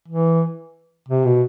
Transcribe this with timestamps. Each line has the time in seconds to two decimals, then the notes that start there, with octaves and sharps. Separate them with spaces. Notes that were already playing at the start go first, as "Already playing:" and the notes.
0.08 E3
1.08 C3
1.25 B2